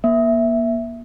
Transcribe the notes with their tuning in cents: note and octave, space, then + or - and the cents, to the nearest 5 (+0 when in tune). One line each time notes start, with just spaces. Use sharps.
A#3 +35 E5 +0